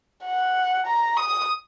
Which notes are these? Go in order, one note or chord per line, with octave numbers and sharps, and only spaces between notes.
F#5
A#5
D#6